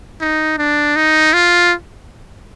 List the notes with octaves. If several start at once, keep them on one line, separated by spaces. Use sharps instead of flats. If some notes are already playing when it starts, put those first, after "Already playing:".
D#4
D4
D#4
F4